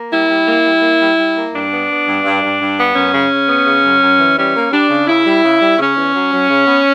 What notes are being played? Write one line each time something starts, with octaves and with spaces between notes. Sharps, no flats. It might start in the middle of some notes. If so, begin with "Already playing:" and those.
Already playing: A#3
G3 E4
G3
A#3
G3
A#3
G3
G3
A#3
G2 D4
B3
B3
G2
G2
G2
G2
B3
F#2 C#4
C#3
C#3
B3
C#3
F#2
F#2
E3
G3 C#4
A#3
G3 D4
C#3
C#3 E4
G3
C#3
G3
C#3 C#4
E2
F#3
F#3
C#3
B3